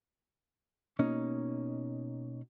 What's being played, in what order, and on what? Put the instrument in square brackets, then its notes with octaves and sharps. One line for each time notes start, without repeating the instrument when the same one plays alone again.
[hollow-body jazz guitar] B2 A#3 C#4 D#4